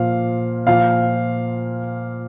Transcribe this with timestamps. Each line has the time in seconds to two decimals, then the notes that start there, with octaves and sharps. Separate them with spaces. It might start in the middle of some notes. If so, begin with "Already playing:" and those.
Already playing: A#2 F3 F5
0.67 A#2 F3 F5